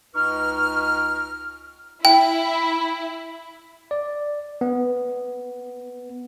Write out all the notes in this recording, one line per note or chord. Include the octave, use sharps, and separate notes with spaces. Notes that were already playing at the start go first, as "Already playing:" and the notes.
C#2 D#4 B4 C#6 F6
E4 G5
D5
B3